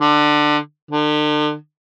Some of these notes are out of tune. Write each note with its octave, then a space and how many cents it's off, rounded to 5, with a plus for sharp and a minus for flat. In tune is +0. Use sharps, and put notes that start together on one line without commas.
D3 +20
D3 +40